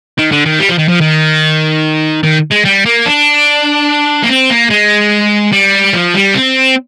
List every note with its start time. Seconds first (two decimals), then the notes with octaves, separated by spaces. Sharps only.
0.19 D#3
0.32 D3
0.46 D#3
0.59 G3
0.69 F3
0.78 D#3
0.88 F3
1.01 D#3
2.24 D#3
2.51 G#3
2.65 G3
2.86 A#3
3.06 D4
4.23 A#3
4.29 C4
4.50 A#3
4.70 G#3
5.52 G3
5.93 F3
6.14 G3
6.34 C4